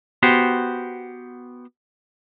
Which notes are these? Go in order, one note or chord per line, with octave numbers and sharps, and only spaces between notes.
B3 F#4 G4 C5